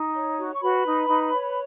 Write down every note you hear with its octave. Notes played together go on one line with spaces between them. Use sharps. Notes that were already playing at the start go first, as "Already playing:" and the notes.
Already playing: D#4
C#5
F#4
C#6
F#4 B4 B5
D#4
D#4
C#5